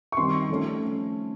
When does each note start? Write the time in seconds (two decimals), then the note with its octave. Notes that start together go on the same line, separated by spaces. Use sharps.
0.12 C#6
0.17 D#3 G3 C4 C6
0.49 F3 A3 C#4